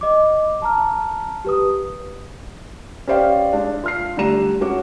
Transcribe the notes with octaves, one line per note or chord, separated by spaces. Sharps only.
D#5 D6
A5 A#5 F6
G4 B4 D#6
C#4 G4 C5 D5 F5 G5
G#3 D4
F4 F6 C7
D3 G3 A3 D4 A#5 E7
G#3 C#4 F#4 C#5 D6